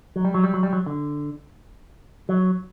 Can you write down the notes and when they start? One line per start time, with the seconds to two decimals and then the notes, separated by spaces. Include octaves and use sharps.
0.16 F#3
0.25 G3
0.34 F#3
0.44 G3
0.54 F#3
0.63 G3
0.73 F#3
0.86 D3
2.29 F#3